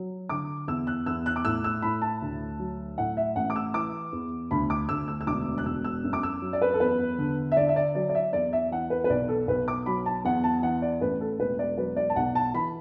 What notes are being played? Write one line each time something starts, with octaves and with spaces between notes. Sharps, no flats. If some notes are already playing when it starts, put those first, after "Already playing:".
Already playing: F#3
D3 D6
E2 E6
F#6
E2 E6
F#6
D6
A2 E6
E6
A2 B5
A5
D2
F#3
A2 F#5
E5
A1 F#5
D6
E6
E3 D6
E2
D2 B5
D6
D2 E6
E6
E6
E1 D6
F#6
E1 E6
E6
F#2
D6
E6
F#3
D5
B4
A4
E2 B4
D3
E5
D3 D5
E5
D5
F#3 D5
D5
E5
E2 D5
E5
E3 F#5
B4
B4
B1 D5
A4
B1 B4
D6
F#3 B5
A5
E2 F#5
A5
E3 F#5
D5
A1 B4
A4
E1 B4
D5
F#3 B4
D5
A5
B1 F#5
A5
E3 B5